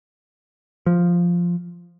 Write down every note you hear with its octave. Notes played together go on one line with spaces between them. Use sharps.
F3